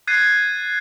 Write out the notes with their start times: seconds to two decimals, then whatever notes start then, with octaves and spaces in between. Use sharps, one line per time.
0.07 F#6 G#6 A6 C7 D#7